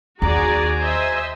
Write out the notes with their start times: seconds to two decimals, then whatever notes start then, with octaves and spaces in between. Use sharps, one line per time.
0.22 D#2 F#4 G#4 D5 G#5 A#5
0.80 C5 D#5 E5